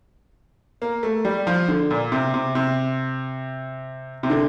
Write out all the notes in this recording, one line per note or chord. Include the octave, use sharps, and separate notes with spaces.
A#3
A3
G3
F3
D3
A#2
C3
C3
C3
C3
D3